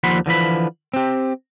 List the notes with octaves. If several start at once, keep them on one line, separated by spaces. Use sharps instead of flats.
D#2 D3 F3 F#5 B5 C6
D3 E3 F3 B5
C4 G4